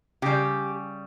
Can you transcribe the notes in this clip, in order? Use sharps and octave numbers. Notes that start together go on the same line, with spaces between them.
C#3 G3 G4